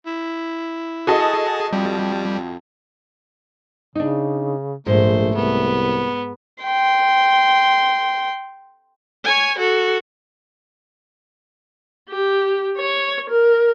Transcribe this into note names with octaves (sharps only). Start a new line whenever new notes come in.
E4
F#4 G#4 A4 D#5 A5
F2 G3
C#3 D4 D#4
A#1 G#2 A3 C5
C2 B3
G5 C6
C#5 G#5
F#4 A4
G4
C#5
A#4